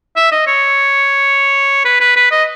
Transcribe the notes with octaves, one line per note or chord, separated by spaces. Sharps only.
E5
D#5
C#5
B4
B4
B4
D#5